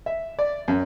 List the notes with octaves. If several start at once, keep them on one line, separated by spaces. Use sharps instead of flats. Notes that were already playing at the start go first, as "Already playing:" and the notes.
E5
D5
F#2